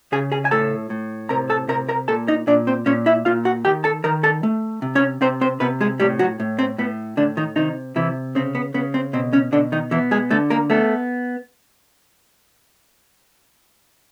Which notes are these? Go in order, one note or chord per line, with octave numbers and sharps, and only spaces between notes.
C#3 G#4 G#5
G#4 G#5
G#5
A2 A4 A5
A2
C3 A#4 A#5
A4 A5
C3 A#4 A#5
A#4 A#5
A#2 A4 A5
D#4 D#5
A#2 D4 D5
C4 C5
A#2 C#4 C#5
E4 E5
A#2 F4 F5
F#4 F#5
D#3 G4 G5
A4 A5
D#3 A#4 A#5
A4 A5
A3
C3
C#4 C#5
C3 C4 C5
C4 C5
C3 B3 B4
G#3 G#4
A2 G3 G4
F#3 F#4
A2
C4
A2 B3
A2 D3 D4
D#3 D#4
C3 D#3 D#4
C3 E3 E4
C#3 C4
B3
C#3 B3
C4
B2 C4
C#3 C#4
B2 D3 D4
D#3 D#4
E3 B3 E4
G#3 G#4
D3 A3 A4
A#3 A#4
A3 B3 A4